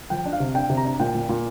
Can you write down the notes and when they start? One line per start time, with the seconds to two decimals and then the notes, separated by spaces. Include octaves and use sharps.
0.10 F3 G5
0.26 D4
0.33 F5
0.40 C3
0.55 D4 G5
0.69 C3
0.77 A#5
0.85 D4
1.00 A#2 G5
1.15 A#2
1.29 A#2